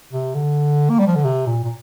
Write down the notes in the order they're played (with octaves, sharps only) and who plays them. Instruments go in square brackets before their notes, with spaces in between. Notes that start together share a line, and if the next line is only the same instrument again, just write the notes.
[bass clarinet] C3
D3
A#3
G3
F3
D3
C3
A#2
A#2